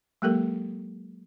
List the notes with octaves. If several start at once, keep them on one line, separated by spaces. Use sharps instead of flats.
F#3 G#3 A#3 G4 A4 A#4